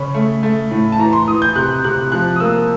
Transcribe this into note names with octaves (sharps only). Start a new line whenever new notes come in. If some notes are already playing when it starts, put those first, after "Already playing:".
Already playing: C#3 C#4 B5
A3
A3
A2
A5
E3 A#5
C6
E3 D#6
G6
C3 F#6
C3 F#6
F3 F#6
D#6
A#3 E6